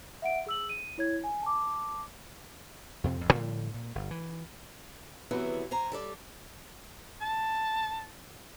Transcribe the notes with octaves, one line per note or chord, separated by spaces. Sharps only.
E5 F#5 D7
G#4 E6 F#7
D#7
E4 C#5 G#6
G#5
A5 D6
F2 C3 C4
G#1 F2
A2 D3 F3 G3
A#2
G1
E3
C3 E3 F#3 B3 E4 G#4
C5 G#5 A#5
G3 A4 D5
A5